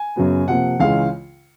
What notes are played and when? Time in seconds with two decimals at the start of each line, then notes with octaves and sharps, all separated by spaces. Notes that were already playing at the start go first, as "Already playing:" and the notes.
Already playing: G#5
0.16 F#2 C#3 F#3 B3
0.48 C3 F3 A#3 F#5
0.80 C#2 C#3 E3 G#3 C#4 F5